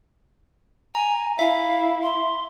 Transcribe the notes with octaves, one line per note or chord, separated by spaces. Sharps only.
G#5 A#5
E4 E5 F5
C6